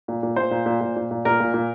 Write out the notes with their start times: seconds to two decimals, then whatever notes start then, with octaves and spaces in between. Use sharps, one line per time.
0.08 A#2
0.23 A#2
0.36 A#2 C5
0.51 A#2
0.66 A#2
0.81 A#2
0.96 A#2
1.11 A#2
1.25 A#2 A#4
1.40 A#2
1.54 A#2